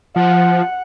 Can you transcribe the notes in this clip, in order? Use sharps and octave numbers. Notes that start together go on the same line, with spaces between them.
F3 F#5